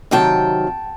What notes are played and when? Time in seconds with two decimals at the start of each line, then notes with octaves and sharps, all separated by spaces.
0.11 C3 D#3 F#3 G5 A5